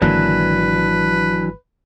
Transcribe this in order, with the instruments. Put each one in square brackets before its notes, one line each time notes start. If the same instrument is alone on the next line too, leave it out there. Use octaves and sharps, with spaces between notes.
[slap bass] G#1 D3 A#3 [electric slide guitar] E3 F#3 D4 [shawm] B4